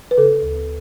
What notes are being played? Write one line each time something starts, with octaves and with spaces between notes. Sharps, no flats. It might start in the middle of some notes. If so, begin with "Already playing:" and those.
B4
C#3 A4
D2